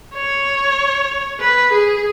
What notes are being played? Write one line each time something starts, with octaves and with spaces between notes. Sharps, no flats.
C#5
B4
G#4